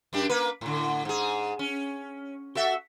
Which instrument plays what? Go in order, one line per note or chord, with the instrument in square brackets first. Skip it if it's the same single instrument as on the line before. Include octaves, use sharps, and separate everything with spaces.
[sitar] F#2 D4 G4
A#3 B4
A2 D3
G#2 G#4
C#4
F#4 A4 E5